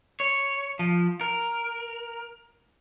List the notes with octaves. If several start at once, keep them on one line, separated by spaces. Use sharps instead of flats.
C#5
F3
A#4